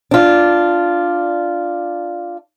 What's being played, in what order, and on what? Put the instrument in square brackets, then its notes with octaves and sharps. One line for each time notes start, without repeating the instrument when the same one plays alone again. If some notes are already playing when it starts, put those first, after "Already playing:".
[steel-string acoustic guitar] D4 F4